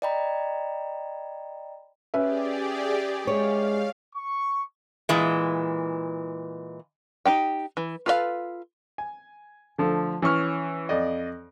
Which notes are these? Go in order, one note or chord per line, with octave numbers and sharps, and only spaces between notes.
D5 D#5 G5 A#5 B5
C#4 G4 G#4 B4 D5 E5
G#3 C#5 F5
C#6
A#2 E3 G#3
D#4 G4 G5
E3
F4 A4 B4 C#5 F5
G#5
D3 F3 A3
E3 C#4 C#6 F6
F2 D5 D#5